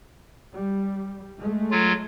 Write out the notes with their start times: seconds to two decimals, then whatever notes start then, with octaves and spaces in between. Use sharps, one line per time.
0.54 G3
1.40 G#3 A3
1.71 F#3 F4